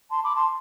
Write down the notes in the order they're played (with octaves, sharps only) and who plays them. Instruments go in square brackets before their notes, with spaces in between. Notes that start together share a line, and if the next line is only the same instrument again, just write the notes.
[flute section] A5 C6
B5 D6
A5 C6